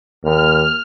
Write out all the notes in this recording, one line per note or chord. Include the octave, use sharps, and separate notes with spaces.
D#2 F6